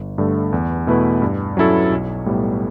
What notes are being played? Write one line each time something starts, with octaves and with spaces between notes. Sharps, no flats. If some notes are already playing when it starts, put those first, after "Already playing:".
Already playing: G1
G2 D3 A3
E2
B2 A3 E4 B4
G2
F#3 C#4 E4 A4
B1
A2 G3 B3